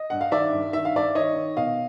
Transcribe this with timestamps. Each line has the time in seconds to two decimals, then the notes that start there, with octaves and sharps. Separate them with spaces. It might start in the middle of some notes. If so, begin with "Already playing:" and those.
Already playing: D#5
0.10 G2 F#5
0.21 F5
0.32 D#3 D5 E5
0.53 G2
0.73 D#3 E5
0.85 F5
0.94 G2 D5 E5
1.15 D#3 C#5 D#5
1.36 D#3
1.57 B2 D#5 F5